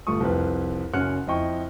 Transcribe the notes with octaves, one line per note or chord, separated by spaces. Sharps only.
G1 G3 A3 F4 C#6 D#6
C2 F2 B4
F#1 C#4 F#4 F6 F#6 C#7
F2 E4 D#5 G5 C#6